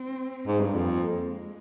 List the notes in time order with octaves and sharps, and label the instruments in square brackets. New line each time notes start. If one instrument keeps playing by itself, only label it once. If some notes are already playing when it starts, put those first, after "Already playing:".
Already playing: [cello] C4
[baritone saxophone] G#2
G2
[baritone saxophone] F2 [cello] A#3
[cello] G#3